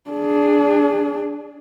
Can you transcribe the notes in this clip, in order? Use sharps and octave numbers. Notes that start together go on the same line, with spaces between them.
D4 G#4